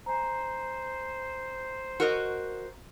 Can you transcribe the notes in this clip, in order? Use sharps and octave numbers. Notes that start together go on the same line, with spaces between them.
C5 G#5 A#5
F#4 A#4 D#5